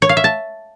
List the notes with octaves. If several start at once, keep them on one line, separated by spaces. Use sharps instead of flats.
C#5
F5
E5
A5